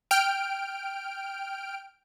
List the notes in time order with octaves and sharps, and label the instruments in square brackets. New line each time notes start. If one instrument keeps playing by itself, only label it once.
[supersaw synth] G5 F6 D7